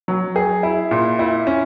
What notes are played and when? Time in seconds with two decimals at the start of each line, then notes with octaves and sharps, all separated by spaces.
0.08 F#3
0.36 G#4
0.63 E4
0.91 A#2
1.19 E4
1.47 C#4